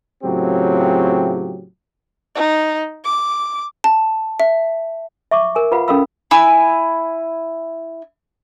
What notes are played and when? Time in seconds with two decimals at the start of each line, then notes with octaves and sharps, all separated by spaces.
0.23 A2 C#3 F#3 C4 F4 G4
2.35 D#4
3.04 D6
3.84 A5
4.40 E5
5.31 E5 C#6 D6
5.55 A#4 G#5
5.72 F4 B4 F5 F#5 B5
5.88 C#4 A4 A#4 F5 B5 E6
6.31 E4 G#5 E6